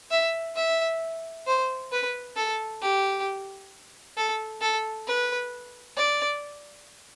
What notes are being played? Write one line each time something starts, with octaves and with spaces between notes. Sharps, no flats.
E5
E5
C5
B4
A4
G4
A4
A4
B4
D5